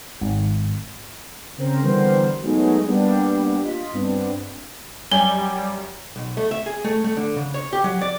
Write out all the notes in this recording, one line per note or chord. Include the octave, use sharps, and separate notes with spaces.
G#1
C#3 C4 A#4 C5 A#5
D3 E3 G3 B3 A#4 C5
F#3 G#3 A3 B3 D#4 G#4
G3 A#3 B3 D4 G4
F4 D#5 B6
G2 B3 C4 D4
F#2 G3 G#5 G7
B1
A3
E5
G#4
A3
A3
D3
C#3
C#5
G4
F#3
D5